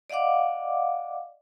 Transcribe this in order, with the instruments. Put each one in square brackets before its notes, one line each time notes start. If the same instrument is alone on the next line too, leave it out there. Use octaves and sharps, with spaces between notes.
[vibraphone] D5 D#5 F5 F#5 D6